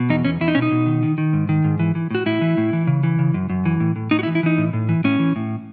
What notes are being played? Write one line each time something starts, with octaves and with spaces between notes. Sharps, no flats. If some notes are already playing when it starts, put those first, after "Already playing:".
Already playing: B2
E2 D#4
E2 C#4
E2 E4
D#4
B2 C#4
D#4
B2
D#3
D#3
D#3
G#2
D#3
G#2
E3
E3
A2 F#4
A2 E4
E3
A2
E3
C#3
E3
C#3
F#2
F#2
E3
A2
A2
A2 D#4
F#4
E4
E3
E4
E3 D#4
A2
A2
E3
A2 C#4
E3
A2